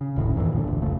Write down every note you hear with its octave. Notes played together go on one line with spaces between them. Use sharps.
C#3
F1 D2 A2 D#3
G2 A#2 D3 E3
C2 A#2 D3
F1 D2
F1 D#2 C#3 A3